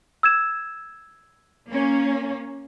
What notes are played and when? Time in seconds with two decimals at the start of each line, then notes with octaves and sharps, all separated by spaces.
0.23 E6 G#6 E7
1.70 A#3 C#4